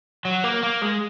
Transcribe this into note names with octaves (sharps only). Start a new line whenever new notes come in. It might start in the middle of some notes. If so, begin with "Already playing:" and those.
F#3
A#3
A#3
G#3